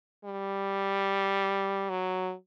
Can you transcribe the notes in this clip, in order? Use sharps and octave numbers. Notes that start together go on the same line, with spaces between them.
G3
F#3